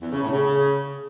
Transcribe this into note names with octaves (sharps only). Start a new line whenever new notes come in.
E2
C#3
A2
C#3